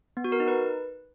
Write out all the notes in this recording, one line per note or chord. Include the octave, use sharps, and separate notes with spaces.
B3
F#4
A#4
D#4
B4